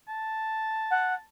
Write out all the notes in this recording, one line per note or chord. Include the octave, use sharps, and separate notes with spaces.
A5
F#5